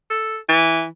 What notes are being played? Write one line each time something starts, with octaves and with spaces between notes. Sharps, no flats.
A4
E3